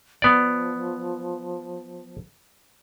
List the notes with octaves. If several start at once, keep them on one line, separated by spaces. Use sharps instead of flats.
F3 B3 D5